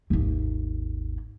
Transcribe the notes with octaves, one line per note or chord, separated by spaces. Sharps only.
G#1 D#2